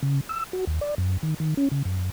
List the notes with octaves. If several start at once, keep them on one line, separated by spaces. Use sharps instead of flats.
C#3
E6
F#4
D#2
D5
F#2
D#3
D#3
C#4
C#3
F#2